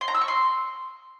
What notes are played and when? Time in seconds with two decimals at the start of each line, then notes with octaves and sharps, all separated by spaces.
0.01 C6
0.08 A#5
0.15 E6
0.21 C#6
0.28 C6